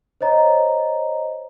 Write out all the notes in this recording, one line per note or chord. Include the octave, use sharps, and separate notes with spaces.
C5 C#5 D#5 A#5